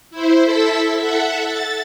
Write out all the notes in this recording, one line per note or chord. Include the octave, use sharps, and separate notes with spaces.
E4 C5
E4 A4 E5 E6
A4 E5 F#5
A6